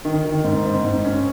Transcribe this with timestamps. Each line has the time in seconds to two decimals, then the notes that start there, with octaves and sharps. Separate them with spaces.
0.05 D#3
0.24 D#3
0.44 G#2
0.66 G#2
0.85 G#2
1.05 C#4